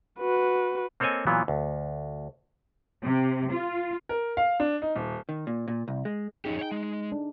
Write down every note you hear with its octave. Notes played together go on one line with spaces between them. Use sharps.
F#4 B4
A#3 C4 A4 C#5 D#5 G#5
A#2 E3 F#3 B3
D2
C3
F4
A#4
F5
D4
D#4
D#1
D#3
A#2
A#2
C2
G#3
F2 C#4 D#4 G4 G#4
C#5 G5
G#3
D4